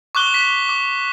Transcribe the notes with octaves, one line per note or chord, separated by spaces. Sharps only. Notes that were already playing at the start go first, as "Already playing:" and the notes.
C#6 D6 F#6 G7
B6
D6